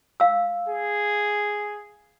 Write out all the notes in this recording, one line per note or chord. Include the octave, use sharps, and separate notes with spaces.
F5 E6
G#4